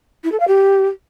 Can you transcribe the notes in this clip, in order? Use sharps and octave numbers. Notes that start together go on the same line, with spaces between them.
E4
A4
F5
G4